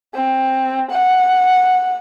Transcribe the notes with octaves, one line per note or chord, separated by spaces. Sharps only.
C4
F#5